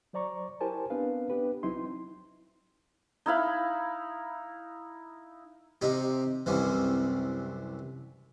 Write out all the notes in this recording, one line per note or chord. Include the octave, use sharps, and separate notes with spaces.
F#3 C5 D5 A#5 C#6
E4 G4 A#4 C5 G#5 A5
B3 C4 D4 B4 F5
B3 D4 G4 B4
C2 F#3 C4 D#4 E4 C6
D#4 E4 F5 B5
C3 D#4 G4
C2 F#2 C3 E3